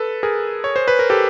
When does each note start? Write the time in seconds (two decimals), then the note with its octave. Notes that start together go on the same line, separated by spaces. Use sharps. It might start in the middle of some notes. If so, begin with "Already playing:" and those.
Already playing: A4 B4
0.23 G#4 A#4
0.64 C#5
0.76 C5
0.88 B4
0.99 A#4
1.10 G4 A4